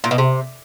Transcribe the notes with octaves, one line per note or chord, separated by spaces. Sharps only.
A#2
B2
C3